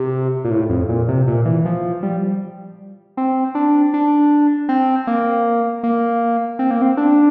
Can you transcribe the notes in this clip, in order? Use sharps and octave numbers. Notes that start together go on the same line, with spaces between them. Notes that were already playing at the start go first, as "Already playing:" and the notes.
Already playing: C3
A#2
A2
F2
A#2
C3
A#2
E3
F3
G3
C4
D4
D4
C4
A#3
A#3
C4
A#3
C4
D4